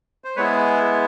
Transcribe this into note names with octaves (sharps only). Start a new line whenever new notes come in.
C5
G#3 B3 E4 G#4 B4 C#5